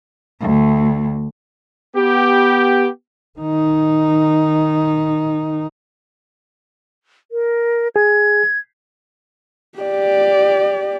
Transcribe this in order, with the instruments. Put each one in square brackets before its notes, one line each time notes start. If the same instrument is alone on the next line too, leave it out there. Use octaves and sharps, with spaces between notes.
[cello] D2
[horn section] B3 G4
[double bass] D#3 D#4
[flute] A#4
[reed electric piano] G#4 [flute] G#6
[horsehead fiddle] G4 D5